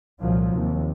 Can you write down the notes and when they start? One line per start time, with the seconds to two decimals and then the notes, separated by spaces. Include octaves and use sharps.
0.20 C2 A#2 F3 F#3
0.51 D#2 C3